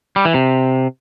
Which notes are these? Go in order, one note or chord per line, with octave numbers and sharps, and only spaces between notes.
G3
E3
C3